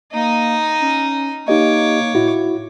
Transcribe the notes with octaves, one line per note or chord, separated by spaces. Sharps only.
A#3 D#4 D#5
C#4
A#3 D#4 G4 C#5 D#5 D6
A2 E4 F#4